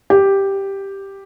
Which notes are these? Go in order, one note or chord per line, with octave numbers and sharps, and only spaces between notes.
G4